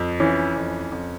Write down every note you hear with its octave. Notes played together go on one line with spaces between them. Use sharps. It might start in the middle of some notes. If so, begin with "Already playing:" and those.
Already playing: F2
E3 C#4
F2
F2